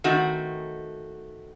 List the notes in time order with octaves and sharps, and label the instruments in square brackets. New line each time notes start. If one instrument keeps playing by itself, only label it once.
[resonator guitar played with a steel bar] D#3 A3 C4 F#4